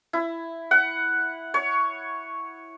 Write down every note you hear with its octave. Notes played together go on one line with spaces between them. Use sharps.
E4
F#5
C#5